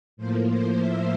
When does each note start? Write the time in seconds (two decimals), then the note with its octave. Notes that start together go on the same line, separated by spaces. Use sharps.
0.17 A2 F3 A#3 C5
0.48 C5
0.78 E5